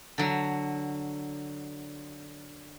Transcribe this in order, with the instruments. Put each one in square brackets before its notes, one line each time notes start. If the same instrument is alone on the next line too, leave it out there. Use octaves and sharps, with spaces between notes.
[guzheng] D3 F#3